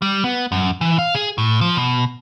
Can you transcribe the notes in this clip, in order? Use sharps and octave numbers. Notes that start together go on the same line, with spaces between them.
G3
B3
F#2
E3
F5
G#4
A2
F3
B2